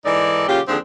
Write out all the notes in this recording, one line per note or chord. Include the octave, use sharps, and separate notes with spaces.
G#2 E3 D#4 A4 D5
A#2 C#3 F#3 F4 G4
D#2 D3 F3 C4 D4 G#4